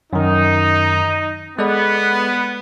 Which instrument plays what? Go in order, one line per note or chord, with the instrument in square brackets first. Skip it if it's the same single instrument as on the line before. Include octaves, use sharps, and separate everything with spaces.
[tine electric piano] F#2 D#3 [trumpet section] D#4
[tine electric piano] G#3 A4 D5 [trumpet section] B3